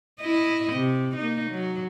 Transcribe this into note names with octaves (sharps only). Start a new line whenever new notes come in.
E4 D#5
C3
A#3 D#4
F#3